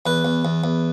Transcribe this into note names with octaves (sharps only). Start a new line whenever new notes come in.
E2 B4
E2
E2
E2